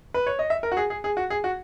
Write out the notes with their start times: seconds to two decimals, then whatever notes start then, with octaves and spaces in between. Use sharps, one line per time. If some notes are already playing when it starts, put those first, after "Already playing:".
0.14 B4
0.27 C#5
0.39 D#5
0.50 E5
0.63 A#4
0.72 F#4
0.77 G#4
0.90 G#4
1.04 G#4
1.17 F#4
1.30 G#4
1.44 F#4